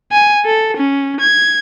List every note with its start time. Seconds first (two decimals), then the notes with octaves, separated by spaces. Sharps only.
0.12 G#5
0.45 A4
0.77 C#4
1.21 G#6